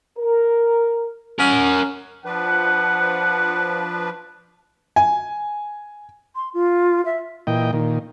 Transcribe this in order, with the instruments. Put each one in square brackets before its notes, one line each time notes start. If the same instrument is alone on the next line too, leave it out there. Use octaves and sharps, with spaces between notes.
[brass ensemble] A#4
[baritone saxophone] C#4 [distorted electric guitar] A#4 F#5
[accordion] F3 D4 B4 [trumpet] F#5
[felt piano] G#5
[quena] C6
F4
E5
[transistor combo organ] A#2 E3 D#5 G5
A#2 D#3